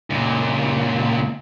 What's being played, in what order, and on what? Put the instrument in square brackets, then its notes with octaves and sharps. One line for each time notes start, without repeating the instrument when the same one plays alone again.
[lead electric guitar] C#2 A#2